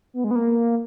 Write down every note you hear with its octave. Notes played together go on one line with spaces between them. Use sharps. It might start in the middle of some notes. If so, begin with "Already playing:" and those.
B3
G#3
B3
A#3